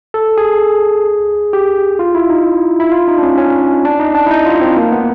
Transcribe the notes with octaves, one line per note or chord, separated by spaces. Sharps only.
A4
G#4
G4
F4
E4
D#4
E4
F4
D#4
D4
C#4
C#4
D4
D#4
D4
E4
D#4
F4
C4
A#3
B3